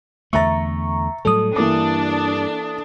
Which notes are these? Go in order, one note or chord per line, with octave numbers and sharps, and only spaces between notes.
E2 D3 A3 E5 A#5 C#6 A6
A2 F#3 G3 A4 D#6
G2 E3 A#3 D4 D6